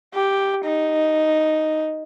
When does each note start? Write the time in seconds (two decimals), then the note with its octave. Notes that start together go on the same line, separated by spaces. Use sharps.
0.14 G4
0.65 D#4